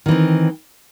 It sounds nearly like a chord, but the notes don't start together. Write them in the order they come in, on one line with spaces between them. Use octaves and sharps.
D#3 E3 C4